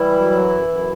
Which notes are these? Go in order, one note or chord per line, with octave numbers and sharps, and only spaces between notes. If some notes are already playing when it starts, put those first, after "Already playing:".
Already playing: E3 G3 E4
F#2
F#3
F#2
F#2